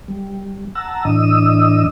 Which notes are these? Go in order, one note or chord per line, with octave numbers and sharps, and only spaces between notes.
G3
F#5 A5 A#5 E6
A2 E3 D4 D#5 D#6 E6